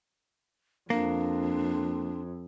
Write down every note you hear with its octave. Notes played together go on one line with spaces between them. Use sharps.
F2 A#3 D4